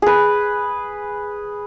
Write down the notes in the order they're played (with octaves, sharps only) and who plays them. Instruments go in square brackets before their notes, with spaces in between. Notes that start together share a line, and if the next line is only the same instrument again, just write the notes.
[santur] G#4 B4